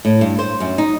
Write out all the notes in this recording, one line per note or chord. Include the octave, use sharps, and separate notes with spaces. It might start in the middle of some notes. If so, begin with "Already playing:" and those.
A2
G2
C5
F#2
D#4